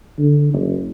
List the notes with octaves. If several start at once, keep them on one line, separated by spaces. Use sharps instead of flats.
D3
F#1